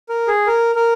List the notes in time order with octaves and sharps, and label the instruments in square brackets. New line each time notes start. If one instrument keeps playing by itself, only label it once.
[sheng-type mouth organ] A#4
G#4
A#4
A#4